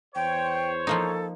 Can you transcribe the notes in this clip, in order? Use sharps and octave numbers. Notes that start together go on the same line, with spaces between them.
E2 C5 C#5 G5
F3 A#3 D#4 A4